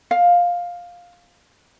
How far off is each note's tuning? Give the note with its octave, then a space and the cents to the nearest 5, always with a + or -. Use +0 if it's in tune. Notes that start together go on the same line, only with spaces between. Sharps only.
F5 +10